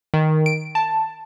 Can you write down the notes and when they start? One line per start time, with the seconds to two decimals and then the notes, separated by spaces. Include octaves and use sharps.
0.14 D#3
0.46 D7
0.75 A5